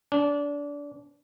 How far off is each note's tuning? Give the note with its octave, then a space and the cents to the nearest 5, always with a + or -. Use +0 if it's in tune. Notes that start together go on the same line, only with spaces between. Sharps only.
D4 -25